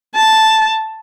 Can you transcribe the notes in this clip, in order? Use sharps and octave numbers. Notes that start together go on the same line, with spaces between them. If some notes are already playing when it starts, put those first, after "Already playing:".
A5